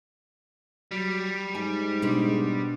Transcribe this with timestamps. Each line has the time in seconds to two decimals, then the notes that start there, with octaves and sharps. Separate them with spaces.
0.91 F#3 G3
1.55 G#2 G#5
2.02 B2 G#3 D4